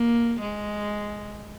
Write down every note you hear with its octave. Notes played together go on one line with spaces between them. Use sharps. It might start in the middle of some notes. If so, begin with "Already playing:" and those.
Already playing: A#3
G#3